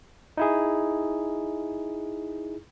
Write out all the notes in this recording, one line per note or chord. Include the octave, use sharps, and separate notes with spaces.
D#4 E4 G#4